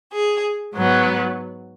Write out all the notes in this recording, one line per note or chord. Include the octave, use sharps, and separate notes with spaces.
G#4
G#2 F#3 B3